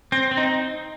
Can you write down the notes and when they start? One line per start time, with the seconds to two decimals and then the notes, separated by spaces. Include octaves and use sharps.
0.12 C4
0.31 C4
0.37 D#4